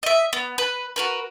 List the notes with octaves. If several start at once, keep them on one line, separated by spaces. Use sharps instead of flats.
D#5 E5
B3
B4
F#4 A#4 B4